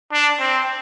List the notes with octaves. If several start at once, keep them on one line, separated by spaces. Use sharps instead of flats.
D4
C4